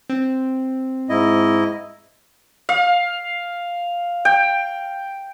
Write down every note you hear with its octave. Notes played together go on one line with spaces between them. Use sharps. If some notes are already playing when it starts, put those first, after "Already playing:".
C4
G#2 E4 D#5
F5
G5